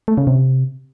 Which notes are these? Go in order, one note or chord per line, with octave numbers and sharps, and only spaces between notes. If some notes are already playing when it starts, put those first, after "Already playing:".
A3
C#3
C3